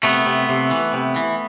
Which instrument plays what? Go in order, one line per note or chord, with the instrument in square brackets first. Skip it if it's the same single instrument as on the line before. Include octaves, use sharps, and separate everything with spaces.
[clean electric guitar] C3 A3 B3
C3
C3
E3
C3
E3